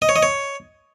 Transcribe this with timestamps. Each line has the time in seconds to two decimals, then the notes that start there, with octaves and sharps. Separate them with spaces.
0.02 D#5
0.09 C#5
0.16 D#5
0.23 C#5